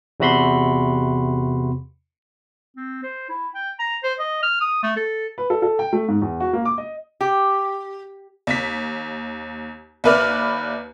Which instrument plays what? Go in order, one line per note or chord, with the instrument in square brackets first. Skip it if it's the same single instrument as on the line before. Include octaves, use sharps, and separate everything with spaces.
[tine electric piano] E2 C3 F#4 B5 C6
[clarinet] C4
C5
E4
G5
A#5
C5
D#5
F6
D#6
A3
A4
[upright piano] B4
A4
A4
G5
A3
G#2
E2
F#4
A#3
D6
D#5
[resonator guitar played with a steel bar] G4
[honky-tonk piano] D#2 B6
D#2 E4 B4 D5 F6